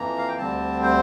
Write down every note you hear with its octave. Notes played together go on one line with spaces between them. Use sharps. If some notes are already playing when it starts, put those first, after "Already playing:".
Already playing: F2 E3 A#3 A#5
F5
G5
D2 D3 G3 C4 A5
C5